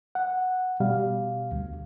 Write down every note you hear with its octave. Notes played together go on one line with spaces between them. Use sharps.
F#5
B2 G3 F5
D2